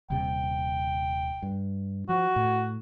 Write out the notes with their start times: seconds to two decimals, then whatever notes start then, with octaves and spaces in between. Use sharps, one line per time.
0.10 D#1 C3 G5
1.43 G2
2.09 F3 F#4
2.36 A2